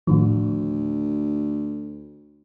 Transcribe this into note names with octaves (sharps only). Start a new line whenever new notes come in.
D2 A2 D#3 F3